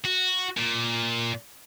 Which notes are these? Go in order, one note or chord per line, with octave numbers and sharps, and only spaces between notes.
F#4
A#2